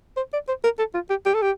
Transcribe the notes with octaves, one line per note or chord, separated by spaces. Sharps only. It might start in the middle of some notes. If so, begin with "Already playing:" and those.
C5
D5
C5
A#4
A4
F4
G4
G4
A4
G4